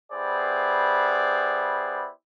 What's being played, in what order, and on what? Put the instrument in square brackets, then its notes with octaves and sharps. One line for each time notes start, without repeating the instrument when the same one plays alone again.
[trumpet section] B3 E4 G4 G#4 C5 D5